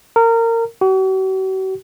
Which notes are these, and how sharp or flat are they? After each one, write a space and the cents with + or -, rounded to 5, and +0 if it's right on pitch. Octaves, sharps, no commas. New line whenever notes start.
A#4 -25
F#4 +45